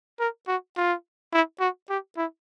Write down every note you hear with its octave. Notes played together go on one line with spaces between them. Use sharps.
A#4
F#4
F4
E4
F#4
G4
E4